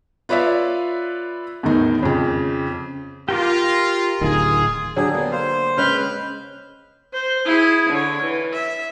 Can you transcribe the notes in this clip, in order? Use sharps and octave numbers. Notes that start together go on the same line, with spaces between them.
F4 B4 C#5 D5 E5 F5
E2 A2 D#3 D#4
F2 C#3
F4 G4 A#4 D6
D1 D#3 F4 G#4
D3 F#3 G4 G#4
A#3 B3
C5 F5
C#3 G#3 B4 G5 F6 G6
C5
E4 G#4
D3 C#5
E3
E5